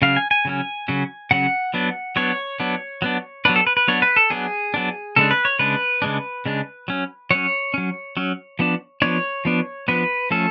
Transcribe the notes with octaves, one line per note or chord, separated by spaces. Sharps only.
C#3 F#3 C#4 F5
G#5
G#5
C#3 F#3 C#4
C#3 F#3 C#4
C#3 F#3 C#4 F#5
F#3 B3 D4
F#3 B3 D4 C#5
F#3 B3 D4
F#3 B3 D4
F#3 B3 D4 B4
A4
B4
B4
F#3 B3 D4 C#5
B4
A4
F#3 B3 D4 G#4
F#3 B3 D4
C#3 G#3 D4 A4
B4
C#5
C#3 G#3 D4 B4
C#3 G#3 D4
C#3 G#3 D4
F#3 C#4
F#3 C#4 C#5
F#3 C#4
F#3 C#4
F3 B3 D4
F3 B3 D4 C#5
F3 B3 D4
F3 B3 D4 B4
F3 A3 C#4 A4